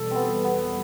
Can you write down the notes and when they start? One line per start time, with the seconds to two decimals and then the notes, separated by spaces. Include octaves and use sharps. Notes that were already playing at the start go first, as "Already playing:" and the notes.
Already playing: E2 B2 G3 A4
0.11 B3 C4
0.44 B3